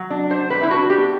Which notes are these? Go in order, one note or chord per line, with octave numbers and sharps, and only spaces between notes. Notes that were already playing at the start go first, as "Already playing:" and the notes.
Already playing: F#3
D4
D4 C5
G3 B4
E4
D4 F#4
B3 G4